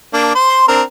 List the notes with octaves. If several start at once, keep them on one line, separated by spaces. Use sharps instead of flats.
A#3 D4
C5 C6
C4 D4 A#4